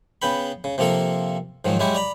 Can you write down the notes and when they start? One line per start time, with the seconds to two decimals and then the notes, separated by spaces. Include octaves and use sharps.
0.22 C#3 B3 G5 B5
0.64 C#3
0.78 C3 F3 A#3 A4 A#4
1.65 G#2 D#3 F3 F#3
1.79 F#3 G#3 E4 F#4 G4
1.95 D5 A#5 B5